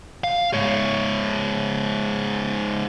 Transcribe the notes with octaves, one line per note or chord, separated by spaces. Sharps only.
F5
G#2 C#5